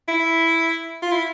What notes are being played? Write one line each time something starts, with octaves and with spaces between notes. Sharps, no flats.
E4
F4
E4